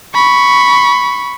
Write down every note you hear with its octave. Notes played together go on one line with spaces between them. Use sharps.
B5 C#6